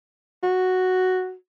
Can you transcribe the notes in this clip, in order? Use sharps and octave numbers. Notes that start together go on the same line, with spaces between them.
F#4